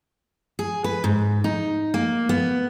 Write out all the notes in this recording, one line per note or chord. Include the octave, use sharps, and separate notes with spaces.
G#4
B4
G#2
D#4
A#3
B3